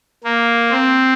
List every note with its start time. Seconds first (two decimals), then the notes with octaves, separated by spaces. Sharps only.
0.24 A#3
0.71 C4